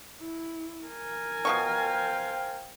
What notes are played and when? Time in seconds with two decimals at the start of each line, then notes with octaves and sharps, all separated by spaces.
0.20 E4
0.87 A#4 G#5
1.45 B2 F3 C5 F5 G5 C#6